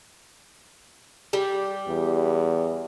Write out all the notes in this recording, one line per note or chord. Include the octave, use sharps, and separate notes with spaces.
G3
E2